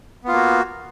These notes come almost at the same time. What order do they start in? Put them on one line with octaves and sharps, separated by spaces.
B3 F4 A#3 F#4